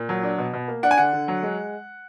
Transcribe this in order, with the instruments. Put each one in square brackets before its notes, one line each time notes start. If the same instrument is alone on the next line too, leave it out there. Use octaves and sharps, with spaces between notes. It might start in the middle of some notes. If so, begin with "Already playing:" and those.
Already playing: [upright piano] A#2
F#3
D4
B2
B2
A#3
D4 F#5
G#5
D3 F#5
D3
F#3
G#3